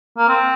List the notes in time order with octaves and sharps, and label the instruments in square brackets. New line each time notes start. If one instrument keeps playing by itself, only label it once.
[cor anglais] A#3
C4